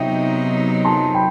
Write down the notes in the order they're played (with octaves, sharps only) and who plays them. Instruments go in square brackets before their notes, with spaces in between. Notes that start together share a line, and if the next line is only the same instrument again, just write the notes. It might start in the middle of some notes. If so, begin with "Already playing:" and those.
Already playing: [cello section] C3 F#3 B3 D#4 [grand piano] E5 G5
[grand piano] A5 C6
G5 B5